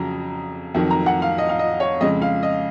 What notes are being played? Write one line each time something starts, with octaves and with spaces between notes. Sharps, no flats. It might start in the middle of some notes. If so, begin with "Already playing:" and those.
Already playing: F2 C#3 F#3 A#5
F2 D#3 F#3
A#5
F#5
F5
D#5
F5
D#5
C#5
F2 C#3 G#3 D#5
F5
D#5